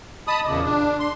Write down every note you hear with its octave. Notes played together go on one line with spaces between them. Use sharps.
D#5 A5 B5 D#6
E2 A#2 C#3 D6
D4
C6